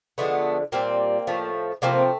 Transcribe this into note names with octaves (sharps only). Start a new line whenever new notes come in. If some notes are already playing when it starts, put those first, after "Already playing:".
D3 F3 G#3 A3 B3
A#2 G3 A#3 C4
A2 F3 A3
C3 F3 A3 A#3 C4